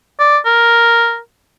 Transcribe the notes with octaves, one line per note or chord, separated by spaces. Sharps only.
D5
A#4